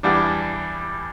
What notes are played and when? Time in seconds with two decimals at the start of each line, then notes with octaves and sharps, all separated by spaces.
0.03 E2 E3 G3 D4